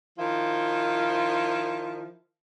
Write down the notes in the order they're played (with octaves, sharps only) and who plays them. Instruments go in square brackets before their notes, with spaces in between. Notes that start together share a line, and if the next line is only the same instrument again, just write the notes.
[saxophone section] D#3 F3 E4 F4